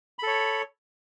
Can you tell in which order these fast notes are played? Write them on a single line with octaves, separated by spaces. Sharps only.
B5 A4 C#5